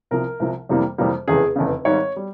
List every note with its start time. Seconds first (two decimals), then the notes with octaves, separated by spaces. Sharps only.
0.11 C2 C3 F3 A#4
0.40 C2 C3 F3
0.69 F2 C3 E3 G3 A#3
0.98 F2 C3 E3 G3 A#3
1.28 F1 E2 C#3 G#4
1.56 F1 E2 C#3
1.85 G#1 G#2 G3 C#5
2.16 G3